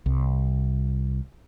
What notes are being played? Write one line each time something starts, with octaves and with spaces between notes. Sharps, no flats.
C2